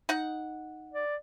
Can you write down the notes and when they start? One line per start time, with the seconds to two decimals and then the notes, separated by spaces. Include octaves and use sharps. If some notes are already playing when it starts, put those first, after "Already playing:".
0.09 D#4 F#5
0.93 D5